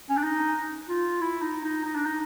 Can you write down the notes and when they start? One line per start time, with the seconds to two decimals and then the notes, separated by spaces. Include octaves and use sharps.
0.09 C#4
0.17 D4
0.23 D#4
0.89 F4
1.21 E4
1.42 D#4
1.64 D#4
1.85 D#4
1.95 D4
2.05 D#4